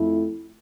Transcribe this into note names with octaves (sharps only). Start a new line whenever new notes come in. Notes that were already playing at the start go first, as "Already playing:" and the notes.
Already playing: F2 A3 E4